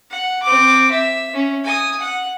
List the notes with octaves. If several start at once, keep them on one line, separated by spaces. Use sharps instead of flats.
F#5
C4 D6
E5
C#4
G#5 D#6
F#5